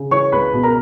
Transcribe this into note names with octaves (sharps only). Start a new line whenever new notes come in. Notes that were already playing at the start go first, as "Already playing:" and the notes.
Already playing: C#3
E3 C#5 C#6
C#2 B4 B5
B2
A#4 A#5